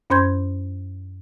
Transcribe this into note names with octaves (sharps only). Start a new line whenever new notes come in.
F#2 C#4 C5 C6 G6 G#6